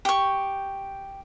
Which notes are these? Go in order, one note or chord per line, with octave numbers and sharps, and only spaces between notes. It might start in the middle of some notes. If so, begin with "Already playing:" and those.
G4 C#6